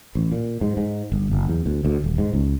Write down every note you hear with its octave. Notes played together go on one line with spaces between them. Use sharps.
A1
A#2
G#2
G#2
G1
F#1
E2
D2
D2
D#1
G#2
C#2